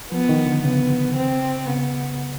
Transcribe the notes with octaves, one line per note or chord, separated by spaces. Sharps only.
F3 B3
D#3
D3
C#3 B3
C4
C#3 B3